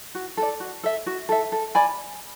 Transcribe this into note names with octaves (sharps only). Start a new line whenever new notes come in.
F#4
A4 D5
F#4
A4 E5
F#4
A4 E5
A4
D5 G#5 B5